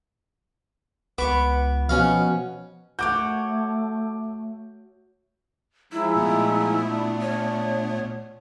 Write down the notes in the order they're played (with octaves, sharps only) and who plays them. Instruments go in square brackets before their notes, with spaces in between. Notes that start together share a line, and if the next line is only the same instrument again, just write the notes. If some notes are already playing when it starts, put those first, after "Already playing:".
[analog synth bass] C#2 [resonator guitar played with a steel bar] B3 [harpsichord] C#6 D6
[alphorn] B2 [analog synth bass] F3 [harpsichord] C#4 F#4 F5
[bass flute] A3 [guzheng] F#4 C#5 [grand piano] D6 G6
[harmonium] F3 G#3 D#4 [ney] E4
[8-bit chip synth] A#2 A3 B3
[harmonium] D4
[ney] C#5